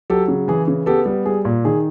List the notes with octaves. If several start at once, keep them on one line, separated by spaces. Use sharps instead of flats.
F#3 G4 A4
C#3
E3 G#4
C#3
B3 G4 A4
G3
G3 G#4
A#2
D#3 G#4